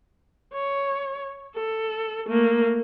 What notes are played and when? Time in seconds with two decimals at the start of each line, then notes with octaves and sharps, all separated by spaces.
0.54 C#5
1.55 A4
2.28 A3 A#3